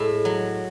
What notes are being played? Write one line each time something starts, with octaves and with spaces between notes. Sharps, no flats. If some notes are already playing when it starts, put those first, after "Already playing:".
Already playing: A2 G#3
F#3